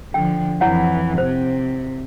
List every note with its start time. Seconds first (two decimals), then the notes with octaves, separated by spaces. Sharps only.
0.14 D3 F3 G5
0.61 F2 E3 E4 C#5 F#5
1.18 C3 C5